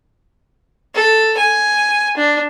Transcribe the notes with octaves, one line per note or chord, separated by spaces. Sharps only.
A4
G#5
D4